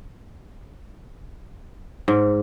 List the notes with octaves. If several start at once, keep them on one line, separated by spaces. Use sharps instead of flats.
G#2